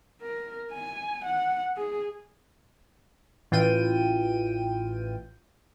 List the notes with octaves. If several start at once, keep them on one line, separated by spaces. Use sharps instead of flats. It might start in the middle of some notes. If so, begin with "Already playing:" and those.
A#4
G#5
F#5
G#4
A1 E3 F4 G5 D#7